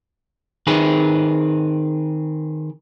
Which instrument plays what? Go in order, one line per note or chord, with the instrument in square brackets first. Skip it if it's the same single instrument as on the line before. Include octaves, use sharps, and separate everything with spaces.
[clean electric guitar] D#3 C4 G#4 B4